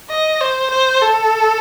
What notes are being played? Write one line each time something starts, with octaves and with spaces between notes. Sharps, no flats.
D#5
C5
C5
A4